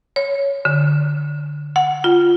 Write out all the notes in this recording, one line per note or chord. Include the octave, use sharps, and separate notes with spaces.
C#5
D3
F#5
F4